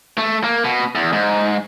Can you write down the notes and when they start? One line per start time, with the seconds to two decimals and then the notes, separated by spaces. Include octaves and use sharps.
0.18 A3
0.44 A#3
0.64 B2
0.95 E2
1.13 G#2